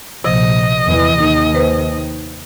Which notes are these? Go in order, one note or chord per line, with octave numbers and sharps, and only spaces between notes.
A#1 C3 F3 D#5
E2 E3
D#2 D#3 D#4
B4 C5